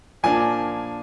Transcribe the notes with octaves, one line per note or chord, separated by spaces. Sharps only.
A#2 F3 A#3 D4 G#5